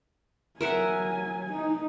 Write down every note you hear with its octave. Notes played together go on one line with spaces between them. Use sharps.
F#3 A#4 E5 F#5 G#5
D#4